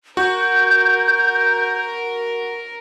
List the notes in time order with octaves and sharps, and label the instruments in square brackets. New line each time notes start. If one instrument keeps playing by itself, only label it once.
[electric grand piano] F#4 [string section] A#4 [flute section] G6